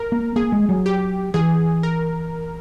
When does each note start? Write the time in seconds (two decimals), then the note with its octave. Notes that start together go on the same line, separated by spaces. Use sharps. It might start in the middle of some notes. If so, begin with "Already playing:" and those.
Already playing: A#4
0.12 A#3
0.36 A#3 G#4
0.52 G#3
0.69 F#3
0.86 G4
1.34 E3 G#4
1.83 A#4